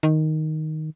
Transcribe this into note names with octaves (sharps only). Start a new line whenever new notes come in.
D#3